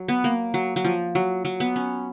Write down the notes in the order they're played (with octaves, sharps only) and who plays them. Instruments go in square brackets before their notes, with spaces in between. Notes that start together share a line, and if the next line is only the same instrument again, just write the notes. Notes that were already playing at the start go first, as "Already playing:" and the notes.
Already playing: [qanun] F#3
B3
A#3
F#3
F#3
F3
F#3
F#3
B3
C#4